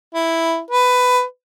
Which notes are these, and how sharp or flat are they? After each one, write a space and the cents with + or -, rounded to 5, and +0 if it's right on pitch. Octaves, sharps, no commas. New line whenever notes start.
E4 +0
B4 +15